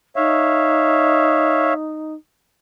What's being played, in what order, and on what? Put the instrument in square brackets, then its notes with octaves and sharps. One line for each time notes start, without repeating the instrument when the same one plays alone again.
[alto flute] D#4 [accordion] C#5 E5 F5